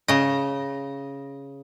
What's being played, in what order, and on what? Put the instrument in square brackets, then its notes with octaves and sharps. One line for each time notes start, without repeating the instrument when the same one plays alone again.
[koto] C#3 D#5